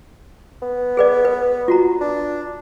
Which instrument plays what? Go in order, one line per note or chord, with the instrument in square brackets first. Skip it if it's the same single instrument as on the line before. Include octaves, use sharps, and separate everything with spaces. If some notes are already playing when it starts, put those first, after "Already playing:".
[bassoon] B3
[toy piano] G#4 B4 D5
B4
F4 F#4 A#5
[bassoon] D4